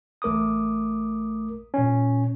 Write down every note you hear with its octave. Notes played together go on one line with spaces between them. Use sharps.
A1 A3 A#4 D6 D#6
A#2 C#4